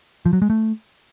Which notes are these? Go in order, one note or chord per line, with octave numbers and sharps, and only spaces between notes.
F3
F#3
G#3
A3